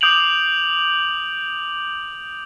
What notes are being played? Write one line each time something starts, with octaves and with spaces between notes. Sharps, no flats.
D6 D#6 G6 D7 F7 F#7